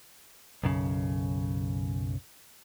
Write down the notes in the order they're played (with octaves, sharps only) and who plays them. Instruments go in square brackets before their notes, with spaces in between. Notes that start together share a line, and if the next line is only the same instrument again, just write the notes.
[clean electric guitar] B1 F#2 C#3